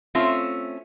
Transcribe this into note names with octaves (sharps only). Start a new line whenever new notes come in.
A3 C4 C#4 F4 E5